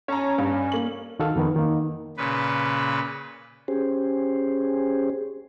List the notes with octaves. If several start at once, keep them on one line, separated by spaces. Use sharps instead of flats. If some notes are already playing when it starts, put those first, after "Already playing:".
C#4 C#5 A5 A#5
G2
A#3 F#7
C2 D#3 F#4 A4 F5
F2 D#3 B3
D#3 A#3
A#2 C#3 B4
C#4 G4 G#4 C5